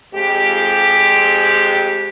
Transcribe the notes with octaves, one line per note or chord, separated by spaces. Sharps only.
F2 G#3 G4